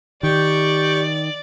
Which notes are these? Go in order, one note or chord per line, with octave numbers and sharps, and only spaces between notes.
D#3 G4 D5 G5 C#6